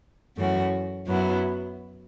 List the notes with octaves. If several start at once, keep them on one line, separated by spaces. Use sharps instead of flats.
F#2 E3 A3 C#4 F#4
F#2 F#3 B3 E4